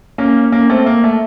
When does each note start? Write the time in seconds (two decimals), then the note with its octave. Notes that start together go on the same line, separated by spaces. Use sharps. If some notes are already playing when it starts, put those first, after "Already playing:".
0.18 A#3 C#4
0.52 A#3 C#4
0.69 A3 C4
0.86 A#3
1.04 A3